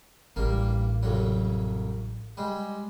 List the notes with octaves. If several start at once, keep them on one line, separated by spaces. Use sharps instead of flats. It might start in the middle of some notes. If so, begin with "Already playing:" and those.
A1 G2 A#3
C2 F2 F#3
G3 G#3